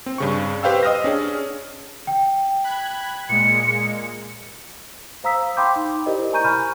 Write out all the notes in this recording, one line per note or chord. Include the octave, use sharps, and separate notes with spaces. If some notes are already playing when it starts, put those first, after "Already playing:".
C4
G2 C#3 C#6
G4 B4 C5 F5 G5 E6
D#5 D#6 F6 A#6
C#4 D4 G#4
G5
B5 F#6 G#6
A#2 G#3 C#7
C5 F5 A#5 D#6 E6 B6
F5 G5 B5 C6 D6 G6
D#4
E4 G4 A#4 C5 D5 D#5
G#5 A#5 C#6 G6 D#7
G#5 A#5 B5 F6 G6